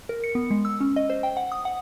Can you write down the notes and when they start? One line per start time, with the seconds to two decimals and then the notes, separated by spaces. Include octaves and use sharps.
0.09 A#4
0.24 C#7
0.35 B3
0.51 G#3
0.65 E6
0.81 C#4
0.96 D#5
1.10 C5
1.23 G5
1.37 F#5
1.52 D#6
1.65 F#5